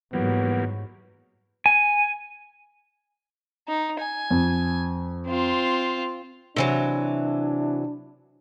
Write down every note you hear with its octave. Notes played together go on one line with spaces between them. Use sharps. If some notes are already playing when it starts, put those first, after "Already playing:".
G#2 E3 F#3 G3 A#3 B3
G#5
D#4
G#5
F2
C4 F4
C3 E3 F#3 D4